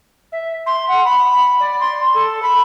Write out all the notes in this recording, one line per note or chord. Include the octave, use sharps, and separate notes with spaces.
E5
C6
F#5
B5
D5
C6
A4
B5